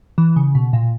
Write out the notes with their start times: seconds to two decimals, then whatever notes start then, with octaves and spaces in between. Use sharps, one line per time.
0.18 E3
0.36 C#3
0.55 B2
0.73 A#2